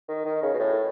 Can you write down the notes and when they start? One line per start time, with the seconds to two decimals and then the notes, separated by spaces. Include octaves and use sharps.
0.09 D#3
0.25 D#3
0.43 C#3
0.53 B2
0.59 A2